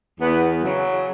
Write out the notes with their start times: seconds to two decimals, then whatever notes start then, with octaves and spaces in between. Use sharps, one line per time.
0.20 E2 B3
0.63 C#3 F#3